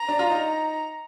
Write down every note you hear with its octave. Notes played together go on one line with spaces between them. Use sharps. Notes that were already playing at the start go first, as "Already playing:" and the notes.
Already playing: A#5
D4
F4
D#4